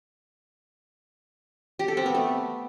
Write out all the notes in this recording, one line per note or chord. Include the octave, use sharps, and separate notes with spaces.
G4
A4
C4
B3
A3